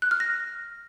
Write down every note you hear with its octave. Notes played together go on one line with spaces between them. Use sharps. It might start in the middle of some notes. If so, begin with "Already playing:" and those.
F#6
F6
A#6